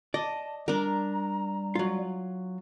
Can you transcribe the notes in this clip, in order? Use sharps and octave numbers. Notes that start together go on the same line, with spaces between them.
D5 D#5 A5
G3 D4 A#4 A#5
F#3 F4